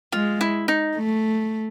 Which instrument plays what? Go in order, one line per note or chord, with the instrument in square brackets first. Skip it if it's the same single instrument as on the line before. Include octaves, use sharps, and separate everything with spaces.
[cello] G#3 [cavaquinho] F4
[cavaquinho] E4
D#4
[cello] A3